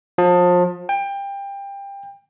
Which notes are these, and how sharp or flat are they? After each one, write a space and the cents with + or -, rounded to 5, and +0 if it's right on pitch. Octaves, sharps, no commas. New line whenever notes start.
F3 +30
G5 +25